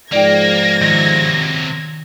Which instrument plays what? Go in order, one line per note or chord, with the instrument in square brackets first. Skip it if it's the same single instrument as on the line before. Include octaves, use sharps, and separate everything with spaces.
[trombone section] G#2 F3 [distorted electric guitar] A#3 [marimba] D5 G5 [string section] G#6 A#6
[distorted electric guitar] C3 F#3 [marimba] D#3